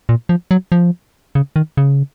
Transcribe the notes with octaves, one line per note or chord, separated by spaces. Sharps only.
A#2
F3
F#3
F3
C#3
D#3
C#3